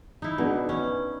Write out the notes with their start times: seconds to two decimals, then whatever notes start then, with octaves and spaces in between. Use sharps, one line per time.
0.22 D#4 E4
0.38 B2 B3 D4 G#4
0.69 C#4